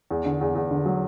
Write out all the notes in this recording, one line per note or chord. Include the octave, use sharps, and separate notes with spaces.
E2
D3
E2
E2
D3
F#3